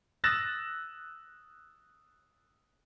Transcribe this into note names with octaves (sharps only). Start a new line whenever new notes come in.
D#6 E6 F#6 A6 A#6 E7